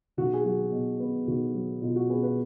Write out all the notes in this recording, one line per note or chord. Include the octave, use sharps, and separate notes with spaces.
B1 F#4
G#4
F#3 F#4
B2
B3
B1 F#4
F#3
B2 F4
F#4
B3 G#4
B4